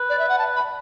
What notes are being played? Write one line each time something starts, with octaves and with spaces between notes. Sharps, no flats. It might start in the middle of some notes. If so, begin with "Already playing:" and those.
Already playing: B4
D5
E5
F#5
A5
B5